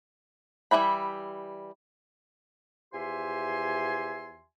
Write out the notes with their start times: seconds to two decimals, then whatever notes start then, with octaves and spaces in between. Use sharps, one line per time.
0.71 E3 F3 G3 E5 B5
2.93 E2 F3 G4 E5 G#5 C6